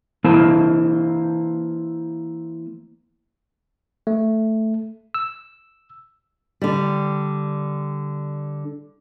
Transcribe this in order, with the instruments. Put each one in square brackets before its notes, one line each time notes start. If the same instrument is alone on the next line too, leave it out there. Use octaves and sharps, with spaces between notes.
[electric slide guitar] E3 A#3 E4 C5 A5
[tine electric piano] A3
E6
[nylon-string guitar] D3 G3